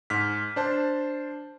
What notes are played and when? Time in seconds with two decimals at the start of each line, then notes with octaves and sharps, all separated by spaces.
0.10 G#2 F6 B6
0.56 D4 C5 A5